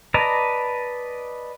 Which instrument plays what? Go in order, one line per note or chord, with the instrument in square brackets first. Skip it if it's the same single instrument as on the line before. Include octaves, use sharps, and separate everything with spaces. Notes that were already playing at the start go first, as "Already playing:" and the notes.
[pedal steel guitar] B4 D5 D#5 A5 A#5